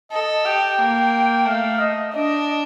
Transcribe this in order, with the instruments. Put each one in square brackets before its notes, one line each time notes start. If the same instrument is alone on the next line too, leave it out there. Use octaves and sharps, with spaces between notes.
[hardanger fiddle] A4 [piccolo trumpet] D#5
[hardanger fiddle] G4 [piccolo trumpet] G5
[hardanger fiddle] A#3
[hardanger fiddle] A3 [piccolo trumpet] F5
[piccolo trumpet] D#5
[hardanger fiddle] D4 [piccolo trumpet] D#5